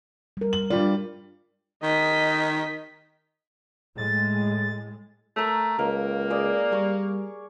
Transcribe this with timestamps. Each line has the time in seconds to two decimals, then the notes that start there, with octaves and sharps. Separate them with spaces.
0.37 G3 A#4
0.53 F#7
0.70 G2 G3 F4 D5
1.83 D#3 D#5 B6
3.98 A2 G#3 A6
5.36 A3 A#4 C#5
5.79 C#2 A#3 A#4
6.30 G#4 D5 D#6
6.72 G3 C#6 D6